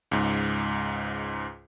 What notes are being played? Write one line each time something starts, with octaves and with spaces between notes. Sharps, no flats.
C#2 G#2